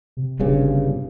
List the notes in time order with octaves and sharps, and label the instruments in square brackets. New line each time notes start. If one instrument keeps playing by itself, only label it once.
[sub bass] C3
[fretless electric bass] G1 G2 C#3